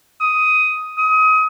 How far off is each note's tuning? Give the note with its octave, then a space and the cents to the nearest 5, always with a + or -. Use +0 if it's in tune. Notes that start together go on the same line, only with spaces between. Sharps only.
D#6 +10
D#6 +30